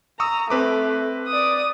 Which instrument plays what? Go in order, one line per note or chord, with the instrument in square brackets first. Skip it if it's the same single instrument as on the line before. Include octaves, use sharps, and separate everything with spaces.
[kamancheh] A#5 [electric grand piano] C#6 D#6 E6
[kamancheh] A3 [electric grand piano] C4 B4 D6
[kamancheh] D5 D#6